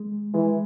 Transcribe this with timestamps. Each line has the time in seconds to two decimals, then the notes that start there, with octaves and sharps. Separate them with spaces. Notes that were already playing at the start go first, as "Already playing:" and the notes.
Already playing: G#3
0.34 E3 G#3